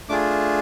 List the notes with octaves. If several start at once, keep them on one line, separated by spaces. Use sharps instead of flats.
A3 D4 F4 G#4 D6